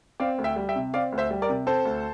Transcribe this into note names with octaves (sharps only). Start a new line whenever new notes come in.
C4 D5 F5
D2
E5 G5
G3
E5 G5
C3
C4 D5 F5
D2
C5 E5
G3
A#4 D5
C3
C4 A4 C5
D2